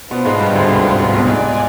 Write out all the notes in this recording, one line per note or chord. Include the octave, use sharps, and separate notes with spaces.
B2 B3 D4 F4 C5
G#2 G#3
G2 G3
D2 D3
C2 C3
G#2
G#2
B1 B2
G#2 F4 G#4 D5 G#5